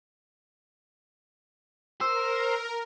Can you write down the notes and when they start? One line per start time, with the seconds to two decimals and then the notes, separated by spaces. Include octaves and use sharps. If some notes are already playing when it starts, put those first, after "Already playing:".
2.01 A#4 C5 E6